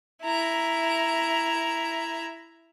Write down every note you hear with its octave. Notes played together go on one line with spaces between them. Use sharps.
E4 A#5